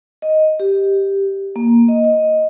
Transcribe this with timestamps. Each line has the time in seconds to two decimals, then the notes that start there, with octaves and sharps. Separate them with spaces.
0.22 D#5
0.60 G4
1.56 A#3
1.88 D#5
2.04 D#5